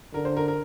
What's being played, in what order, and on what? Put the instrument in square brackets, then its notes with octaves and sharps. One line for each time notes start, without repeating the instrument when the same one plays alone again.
[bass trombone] D3 [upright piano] A#4
[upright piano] C5
A#4
A#4